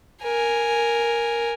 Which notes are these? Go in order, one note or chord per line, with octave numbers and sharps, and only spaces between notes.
A#4 G#5